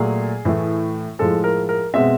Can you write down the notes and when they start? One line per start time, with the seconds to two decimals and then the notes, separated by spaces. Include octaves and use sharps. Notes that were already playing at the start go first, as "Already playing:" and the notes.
Already playing: A#2 F#3 A3 G#4
0.45 A2 E3 A3
1.19 A2 F3 G#3 A4
1.44 A#4
1.69 A#4
1.94 B2 G#3 C4 E5